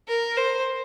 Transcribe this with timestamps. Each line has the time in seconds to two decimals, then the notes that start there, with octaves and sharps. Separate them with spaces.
0.08 A#4
0.37 C5